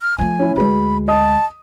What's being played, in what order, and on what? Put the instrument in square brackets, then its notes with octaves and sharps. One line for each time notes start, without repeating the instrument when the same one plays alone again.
[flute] F6
[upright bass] F3 A3 [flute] G#5
[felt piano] C#4 E4
[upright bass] D2 G#3 [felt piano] F#4 G#4 B4 [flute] B5
[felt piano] D#5 D#6 [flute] A5